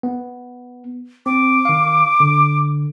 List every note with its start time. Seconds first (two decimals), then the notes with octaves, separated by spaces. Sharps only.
0.03 B3
1.26 C4 D6
1.65 D#3 F5
2.20 D3